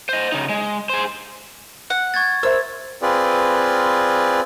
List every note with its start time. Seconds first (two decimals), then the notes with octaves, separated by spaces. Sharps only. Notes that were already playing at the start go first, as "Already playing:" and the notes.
0.09 C5 D#5
0.32 C#3 D#4
0.49 G#3
0.89 G#4 C5
1.90 F#5
2.14 C#6 G#6 A6
2.43 A#4 C5 E5 E6
3.02 C4 F4 G#4 B4 D5